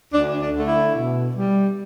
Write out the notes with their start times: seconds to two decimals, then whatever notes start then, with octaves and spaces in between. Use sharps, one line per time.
0.13 D2 D4
0.41 D4
0.54 D3 A3
0.67 E4
0.95 B2
1.35 G3